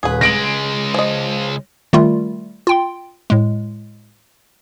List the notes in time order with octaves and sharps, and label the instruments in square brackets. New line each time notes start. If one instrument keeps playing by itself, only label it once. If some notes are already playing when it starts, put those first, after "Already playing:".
[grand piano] D#1 [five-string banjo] G#4 B4
[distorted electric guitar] C#2 G#3 [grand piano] A#6 D7 F#7
[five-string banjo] F3 D#5
[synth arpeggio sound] D#3 G3 A3 F4
F4 G5 C6
A2 G#3